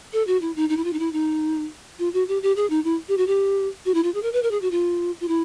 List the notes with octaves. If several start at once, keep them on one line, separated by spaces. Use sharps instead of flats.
A4
F#4
E4
D#4
D#4
E4
F4
D#4
E4
D#4
F4
F#4
G4
G4
G#4
D#4
E4
G4
F#4
G4
F#4
E4
F4
G#4
A#4
B4
A#4
G#4
F#4
F4
F4
E4